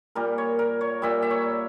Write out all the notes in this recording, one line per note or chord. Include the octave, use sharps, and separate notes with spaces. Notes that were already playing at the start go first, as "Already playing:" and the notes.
A#2 G3 A#4
C#5
A#4
C#5
A#2 G3 E5
E5
C#5